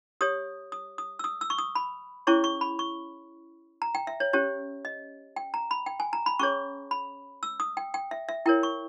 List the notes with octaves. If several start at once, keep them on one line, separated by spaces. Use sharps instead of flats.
G4 C#5 D#6
D#6
D#6
E6
D#6
E6
C#6
D#6
B5
C#4 E4 G#4 C#5 C#6
C#6
B5
C#6
A#5
G5
E5
C#5
C#4 G4 C#5
D#5
G5
A#5
B5
G5
G#5
A#5
B5
C#4 G#4 C#5 C#6
B5
E6
D#6
G5
G5
E5
E5
E4 A#4 C#5 G5
C#6